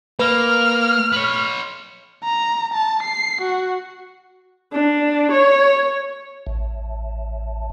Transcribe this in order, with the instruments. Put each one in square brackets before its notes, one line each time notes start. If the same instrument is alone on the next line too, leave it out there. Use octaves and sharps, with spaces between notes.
[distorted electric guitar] A#3 [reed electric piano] B4 [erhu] F6
[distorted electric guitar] B4 C#5
[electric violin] A#5
A5
C7
F#4
[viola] D4
C#5
[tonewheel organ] A1